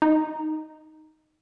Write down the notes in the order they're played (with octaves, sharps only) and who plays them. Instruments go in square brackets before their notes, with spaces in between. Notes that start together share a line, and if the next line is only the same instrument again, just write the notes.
[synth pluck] D#4